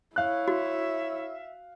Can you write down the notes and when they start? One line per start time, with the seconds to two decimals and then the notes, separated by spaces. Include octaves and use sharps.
0.16 E4 C#5 F5 F#6
0.48 F#4 E5